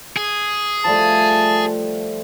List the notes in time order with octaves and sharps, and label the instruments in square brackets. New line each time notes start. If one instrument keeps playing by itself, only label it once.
[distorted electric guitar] G#4
[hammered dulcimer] F3 G3 A3 [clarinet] A5